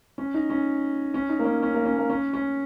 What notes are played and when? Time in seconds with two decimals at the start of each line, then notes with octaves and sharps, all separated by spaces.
0.18 C#4
0.34 D#4
0.50 C#4
1.14 C#4
1.29 D#4
1.39 A#3
1.45 C#4
1.62 C#4
1.74 A#3
1.85 C#4
1.97 A#3
2.10 C#4
2.34 C#4